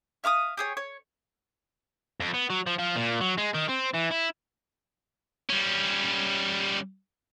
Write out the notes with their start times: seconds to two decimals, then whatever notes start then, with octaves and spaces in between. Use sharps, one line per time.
0.24 E5 F5 D6 D#6
0.57 G4 G#4 C#5
0.77 C#5
2.20 F2
2.34 B3
2.50 F#3
2.67 F3
2.79 F3
2.96 A#2
3.21 F#3
3.38 G#3
3.54 D#3
3.68 C4
3.94 E3
4.11 E4
5.50 G3 C#4